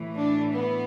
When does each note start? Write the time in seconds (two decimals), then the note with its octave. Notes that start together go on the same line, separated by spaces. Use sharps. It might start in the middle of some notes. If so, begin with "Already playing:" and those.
Already playing: A2 E3
0.16 D4
0.52 B3